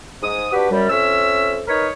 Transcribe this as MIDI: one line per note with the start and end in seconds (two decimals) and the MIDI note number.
0.23 0.48 44
0.23 0.48 87
0.52 0.67 62
0.52 0.67 66
0.52 0.67 67
0.52 0.67 71
0.71 0.87 42
0.71 0.87 55
0.90 1.60 41
0.90 1.60 61
0.90 1.60 76
0.90 1.60 88
1.67 1.87 63
1.67 1.87 70
1.67 1.87 71
1.67 1.87 73